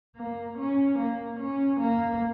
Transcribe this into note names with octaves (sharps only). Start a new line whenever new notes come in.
A#3
C#4
A#3
C#4
A#3